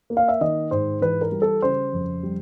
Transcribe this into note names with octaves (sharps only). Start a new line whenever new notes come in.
A#3
F5
E5
D#3 D#5
G#2 C5
E3 B4
A#4
G3
A4
C#3 C5
F2
G3